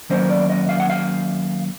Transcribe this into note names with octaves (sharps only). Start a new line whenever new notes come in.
D#3 F#3 A#3 C#4 C5
D5
D#5
F5
F#5
F5